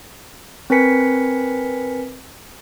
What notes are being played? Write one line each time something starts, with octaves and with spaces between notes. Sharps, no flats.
C4 A#4 B4 G#5 B6 C#7